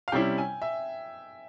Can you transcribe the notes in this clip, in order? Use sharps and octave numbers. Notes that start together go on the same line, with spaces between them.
F5
C3 G3 C#4 E4 G5
G#5
E5